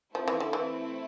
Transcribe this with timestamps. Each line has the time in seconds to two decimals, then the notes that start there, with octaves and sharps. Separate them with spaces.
0.14 F3 A3 C4 E4
0.28 E3
0.40 D3
0.53 E3